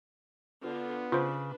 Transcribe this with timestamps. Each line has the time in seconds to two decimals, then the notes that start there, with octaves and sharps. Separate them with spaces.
0.64 D3 B3 D4 F4
1.12 C#3 D4 F4 B4 C5